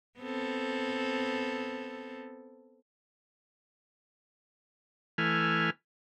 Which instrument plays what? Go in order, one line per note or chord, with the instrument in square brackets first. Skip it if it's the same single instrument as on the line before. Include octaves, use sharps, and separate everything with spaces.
[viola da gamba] B3 C4 A4
[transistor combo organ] E3 A3 G#5 F6